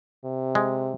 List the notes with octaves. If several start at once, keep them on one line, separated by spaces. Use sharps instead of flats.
C3
G#3